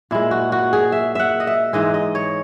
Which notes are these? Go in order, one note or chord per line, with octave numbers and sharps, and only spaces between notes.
A#2 G#3 E4
F#4
F#4
G#4
E5
E5 F#5
D#5
E5
G#2 E3 G#3 D#5
D#5
C#5